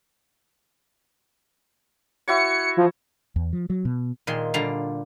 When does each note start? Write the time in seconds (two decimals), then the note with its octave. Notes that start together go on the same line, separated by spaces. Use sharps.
2.28 E4 F#4 C#5 C#7
2.77 F3
3.36 E2
3.53 F3
3.70 F#3
3.85 B2
4.27 A#2 D#3 G#3 C6
4.54 A#2 D3 G3 F4 F5 A#5